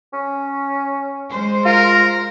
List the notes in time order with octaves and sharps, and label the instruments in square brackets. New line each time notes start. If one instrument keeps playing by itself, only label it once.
[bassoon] C#4
[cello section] G#3 C5
[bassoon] F4 [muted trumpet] A#4